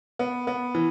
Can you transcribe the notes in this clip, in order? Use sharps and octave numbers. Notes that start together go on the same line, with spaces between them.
B3
B3
E3